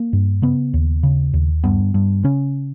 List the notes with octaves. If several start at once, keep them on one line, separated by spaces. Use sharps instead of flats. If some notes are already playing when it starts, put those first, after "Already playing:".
Already playing: A#3
G2
C#3 B3
D#2
C#3
D#2
G2 B3
G2
C#3 C#4